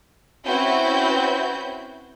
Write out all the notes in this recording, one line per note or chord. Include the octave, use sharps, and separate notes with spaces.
C4 C#4 E4 F#4 B4 G6